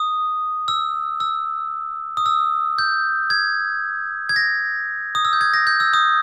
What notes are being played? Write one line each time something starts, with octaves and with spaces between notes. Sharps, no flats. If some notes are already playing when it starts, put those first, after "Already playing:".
Already playing: D#6
E6
E6
D#6
E6
G6
G#6
G#6
A#6
D#6
E6
G6
G#6
A#6
G6
E6
D#6